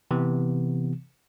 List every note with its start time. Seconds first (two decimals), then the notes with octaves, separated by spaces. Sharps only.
0.11 C3 E3 B3